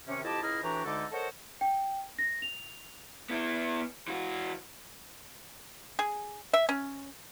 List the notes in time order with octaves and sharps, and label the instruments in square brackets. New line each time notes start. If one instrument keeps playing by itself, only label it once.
[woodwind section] C3 D#3 C#4
F2 E4 G4 D#5 A5
C#2 E4 G#4 D#5 A#5 F6
A2 E3 D4 F#4 G4 A#5
D2 D3 G#3 D#4 A4 D6
A4 A#4 C5 C#5 D#5 F#5
[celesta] G5
A#6
F7
[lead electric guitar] B3 E4
E3 F#4
[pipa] G#4
E5
C#4